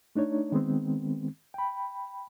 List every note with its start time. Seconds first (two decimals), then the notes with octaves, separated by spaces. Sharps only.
0.16 A3 D4 D#4 C#5
0.52 D#3 G#3 B3 C4
1.54 G5 B5